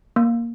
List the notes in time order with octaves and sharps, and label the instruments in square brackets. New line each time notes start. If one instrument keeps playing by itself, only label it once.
[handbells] A#3